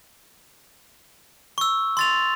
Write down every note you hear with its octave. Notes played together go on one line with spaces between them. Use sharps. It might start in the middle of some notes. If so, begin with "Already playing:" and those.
C#6 E6
C6 A6 F7